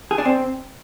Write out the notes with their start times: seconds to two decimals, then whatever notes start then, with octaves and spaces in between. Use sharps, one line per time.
0.11 G#4
0.18 D4
0.25 C4